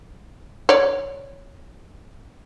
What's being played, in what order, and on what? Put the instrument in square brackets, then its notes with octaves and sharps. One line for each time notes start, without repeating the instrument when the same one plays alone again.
[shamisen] C#5 D5